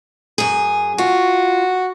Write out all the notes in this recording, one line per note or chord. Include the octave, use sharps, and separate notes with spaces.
F#2 G#4
F4 F#4